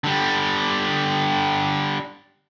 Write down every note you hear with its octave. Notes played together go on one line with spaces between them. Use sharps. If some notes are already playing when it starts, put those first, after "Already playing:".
D3 G3